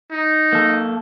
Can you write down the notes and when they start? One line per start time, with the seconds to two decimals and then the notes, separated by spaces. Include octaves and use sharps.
0.12 D#4
0.53 A#3 A4